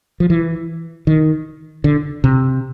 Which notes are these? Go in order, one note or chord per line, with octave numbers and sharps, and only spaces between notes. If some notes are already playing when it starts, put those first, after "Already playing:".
F3
E3
D#3
D3
C3